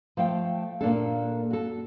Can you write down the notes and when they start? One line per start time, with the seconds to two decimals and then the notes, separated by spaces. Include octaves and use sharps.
0.17 F3 A3 F5 G5
0.81 A#2 A#3 D4 A4
1.50 F#4 A4